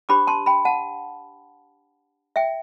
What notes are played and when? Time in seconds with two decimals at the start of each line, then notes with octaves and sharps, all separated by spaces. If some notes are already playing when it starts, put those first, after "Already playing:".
0.09 D4 G4 C5 B5 D6
0.27 A5 C6
0.46 G5 B5
0.65 F#5 A5
2.36 E5 G5